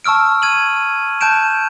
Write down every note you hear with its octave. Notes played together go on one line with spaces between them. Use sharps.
A5 C#6 E6 F6 D7
G#6 D#7 F#7
A5 F#6 G6 D7 E7